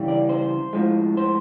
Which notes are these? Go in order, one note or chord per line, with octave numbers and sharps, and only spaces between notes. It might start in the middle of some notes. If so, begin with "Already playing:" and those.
Already playing: C#3 E3 G3
D5
C5
A2 F3 G#3
C5